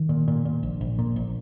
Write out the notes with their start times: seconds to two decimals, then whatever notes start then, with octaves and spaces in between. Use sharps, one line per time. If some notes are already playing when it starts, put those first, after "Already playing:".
Already playing: D#3
0.09 A#2
0.28 A#2
0.45 A#2
0.63 A#1
0.81 A#1
0.99 A#2
1.16 A#1